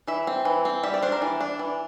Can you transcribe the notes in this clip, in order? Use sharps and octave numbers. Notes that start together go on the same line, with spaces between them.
E3 E5
C4
E3
C4
G3 E5
D5
D4 C5
A#4
E3
D4
E3